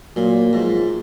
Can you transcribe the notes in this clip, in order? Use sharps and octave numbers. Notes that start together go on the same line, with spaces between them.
A#2 F#3
G#2 F3